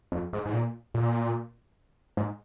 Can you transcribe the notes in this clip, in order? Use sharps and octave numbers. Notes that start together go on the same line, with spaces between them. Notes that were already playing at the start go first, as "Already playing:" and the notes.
F2
G#2
G#2
A#2
A#2
G#2